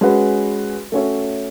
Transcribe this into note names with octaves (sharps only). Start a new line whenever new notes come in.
G#3 C#4 F#4 B4
A3 C#4 F#4 C#5 E5